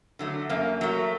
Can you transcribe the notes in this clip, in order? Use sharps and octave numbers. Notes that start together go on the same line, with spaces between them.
D3 F#3 A3
F#2 A#3
F#3 A3